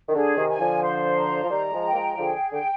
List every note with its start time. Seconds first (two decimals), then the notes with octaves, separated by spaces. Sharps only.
0.09 D#3
0.14 D3 G#4
0.37 C3 D#3
0.49 G#5
0.59 D3 F3
0.82 C5
1.16 A#5
1.43 F3
1.50 D#3 G3 A#5
1.73 F3 G#3
1.83 G5
1.91 A#3
1.94 F3 G#3
2.17 D3 F3 G#4
2.51 D3 G5